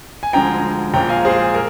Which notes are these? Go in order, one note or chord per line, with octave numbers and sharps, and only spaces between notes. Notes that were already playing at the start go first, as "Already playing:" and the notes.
G#5
D2 D3 F3 G#3 G5 A#5
A#1 A#2 G#3 G5 A#5
F5 G#5
G#4 C5
A#4